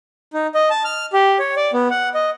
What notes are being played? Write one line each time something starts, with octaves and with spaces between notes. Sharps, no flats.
D#4
D#5
A5
F6
G4
C#5
D5
B3
F#5
D#5